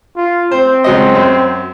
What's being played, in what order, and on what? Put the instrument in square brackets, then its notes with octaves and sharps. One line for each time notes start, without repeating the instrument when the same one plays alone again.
[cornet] F4
[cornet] C4 [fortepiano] C5
[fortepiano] C#2 F#3 D#5
F#2 F#3